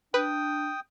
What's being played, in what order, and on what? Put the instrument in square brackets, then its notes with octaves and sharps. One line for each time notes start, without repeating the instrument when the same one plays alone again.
[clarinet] D4 [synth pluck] B4 [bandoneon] G5 D#6